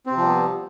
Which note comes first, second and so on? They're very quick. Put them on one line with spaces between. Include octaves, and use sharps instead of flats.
C4 C3 F3 G3 B3